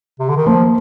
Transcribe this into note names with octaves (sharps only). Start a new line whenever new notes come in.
C3
D3
D#3
F3 A#3